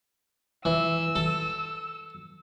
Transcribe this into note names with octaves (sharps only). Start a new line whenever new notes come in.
E3 E6
A4